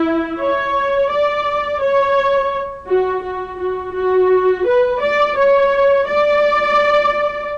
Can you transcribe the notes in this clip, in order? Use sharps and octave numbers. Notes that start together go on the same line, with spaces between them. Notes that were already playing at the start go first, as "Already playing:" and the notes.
Already playing: E4
C#5
D5
C#5
F#4
F#4
F#4
F#4
B4
D5
C#5
D5